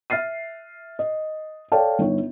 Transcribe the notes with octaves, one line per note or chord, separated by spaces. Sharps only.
E5 F6 A6 C7 D#7
D#5
A4 C#5 D5 F5 G5 A5
G1 D#4 C#5